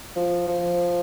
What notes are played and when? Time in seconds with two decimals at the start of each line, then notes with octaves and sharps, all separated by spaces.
0.16 F3
0.48 F3